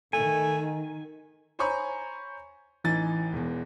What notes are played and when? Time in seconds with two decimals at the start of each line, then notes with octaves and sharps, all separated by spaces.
0.13 D#3 A3 G#5
1.59 C5 C#5 G#5 A#5 B5 C#6
2.84 A1 E3 D#4 G#5 A6
3.33 E1 E2